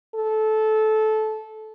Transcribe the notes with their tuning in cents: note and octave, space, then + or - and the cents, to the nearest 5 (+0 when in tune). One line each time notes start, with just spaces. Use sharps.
A4 -20